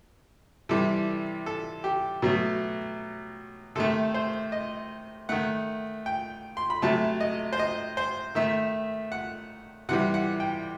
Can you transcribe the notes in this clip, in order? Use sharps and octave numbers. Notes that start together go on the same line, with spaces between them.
C3 E3 G3 A4
A4
G4
B2 F#3 A3
C3 D#3 A3 A4
C5
D#5
D#3 A3 F#5
G5
C6
B5
C3 F#3 A3 A5
D#5
C5
D#5
C5
D#3 A3 E5
F#5
C3 E3 G3 F#5
F#5
G5